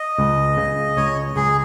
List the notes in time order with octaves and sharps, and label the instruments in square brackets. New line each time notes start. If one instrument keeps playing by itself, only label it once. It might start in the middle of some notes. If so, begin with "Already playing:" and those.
Already playing: [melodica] D#5
[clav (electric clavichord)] C#2
C#3
[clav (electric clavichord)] C#2 [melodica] C#5
[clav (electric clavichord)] C#2 [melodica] G#4